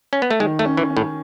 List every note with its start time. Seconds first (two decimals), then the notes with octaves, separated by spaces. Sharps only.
0.13 C#4
0.22 B3
0.31 A3
0.40 D#3 G#3
0.59 A3
0.65 C#4
0.77 E3
0.90 C#4
0.97 A2